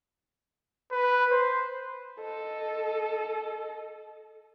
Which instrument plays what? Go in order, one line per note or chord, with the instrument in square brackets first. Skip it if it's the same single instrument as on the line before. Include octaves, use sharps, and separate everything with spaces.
[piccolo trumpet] B4
C5
[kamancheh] A4 D#5